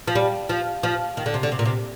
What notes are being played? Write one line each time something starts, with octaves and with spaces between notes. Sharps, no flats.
F3
G3
F3
F3
D#3
D3
C3
D3
C3
A#2
C3